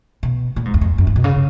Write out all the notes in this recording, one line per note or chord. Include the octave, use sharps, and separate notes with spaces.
B2
A#2
G#2
E2
F2
F#2
G2
B2
C#3